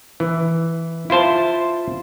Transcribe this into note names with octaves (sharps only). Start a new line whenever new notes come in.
E3
E4 F4 C5 A5